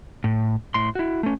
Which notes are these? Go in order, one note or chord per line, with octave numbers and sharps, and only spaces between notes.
A2
A2 C6
E4 F#4
A3 C#4